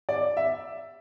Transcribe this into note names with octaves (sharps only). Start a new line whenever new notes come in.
D5
E5